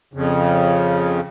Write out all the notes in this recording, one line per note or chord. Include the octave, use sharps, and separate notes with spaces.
F2 C#3